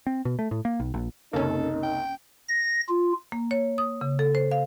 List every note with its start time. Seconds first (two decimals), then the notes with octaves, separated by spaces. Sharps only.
0.07 C4
0.25 B2
0.39 A3
0.51 A2
0.65 A#3
0.80 B1
0.94 A#1
1.33 F#1 C2 A#3 C#4 D#4 A4
1.83 G5
2.48 A#6
2.89 F4
3.32 A#3
3.51 C#5
3.78 D#6
4.01 C#3
4.19 A4
4.35 C5
4.51 F5